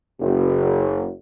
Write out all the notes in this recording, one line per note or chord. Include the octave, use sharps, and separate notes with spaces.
F#1